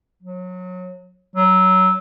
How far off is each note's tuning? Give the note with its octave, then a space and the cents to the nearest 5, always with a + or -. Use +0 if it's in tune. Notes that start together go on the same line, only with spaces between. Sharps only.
F#3 -25
F#3 +15